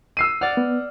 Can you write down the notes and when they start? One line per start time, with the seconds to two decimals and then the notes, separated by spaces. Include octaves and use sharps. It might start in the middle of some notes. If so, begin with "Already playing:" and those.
0.17 E6 C7 D#7
0.41 D5 F#5 F6
0.57 B3